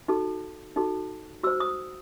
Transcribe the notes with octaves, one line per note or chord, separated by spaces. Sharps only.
D#4 F#4 A4
D#4 F#4 A4
F#4 C5 E6
D#6